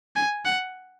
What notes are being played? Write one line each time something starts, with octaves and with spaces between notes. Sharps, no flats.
G#5
F#5